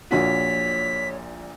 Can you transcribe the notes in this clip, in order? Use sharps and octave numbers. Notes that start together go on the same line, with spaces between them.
A#1 A#2 F#4 C#5 B6